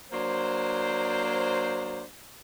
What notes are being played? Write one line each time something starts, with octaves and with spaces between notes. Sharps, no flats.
F#3 A#3 D4 C5